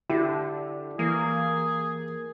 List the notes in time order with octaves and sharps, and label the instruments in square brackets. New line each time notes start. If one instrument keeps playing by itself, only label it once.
[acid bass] D3 [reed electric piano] E4 [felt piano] G4
[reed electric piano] E3 [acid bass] A#3 [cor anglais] G#4